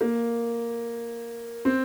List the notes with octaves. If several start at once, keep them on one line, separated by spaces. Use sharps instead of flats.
A#3
C4